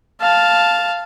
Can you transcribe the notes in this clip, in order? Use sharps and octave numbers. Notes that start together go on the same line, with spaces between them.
F5 A5